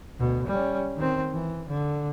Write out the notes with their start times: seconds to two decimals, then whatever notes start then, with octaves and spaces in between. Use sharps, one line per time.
0.19 D2 B2
0.47 G3 C#4
0.96 D#3 C4
1.33 E3
1.68 D3